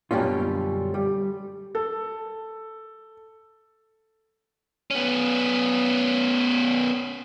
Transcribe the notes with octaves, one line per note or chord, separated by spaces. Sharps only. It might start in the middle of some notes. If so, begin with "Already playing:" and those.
F#2 B2 D3 G3 C#4 F4
G3
A4
B3 C#4